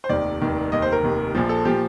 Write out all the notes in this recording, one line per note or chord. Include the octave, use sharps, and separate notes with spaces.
C5
F1 D#2 D#3 D5
F1 D#2 D#3
F1 D#2 D#3 D#5
C5
A#4
F1 D#2 D#3
A#1 A#2 F3
A4
A#2 F3 G4